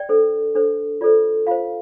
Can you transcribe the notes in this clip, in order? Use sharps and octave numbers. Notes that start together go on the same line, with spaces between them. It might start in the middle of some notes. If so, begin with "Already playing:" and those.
Already playing: D5 G5
D4 A4 C5
D4 A4 C5
F4 A4 C5 D5
F4 C5 F5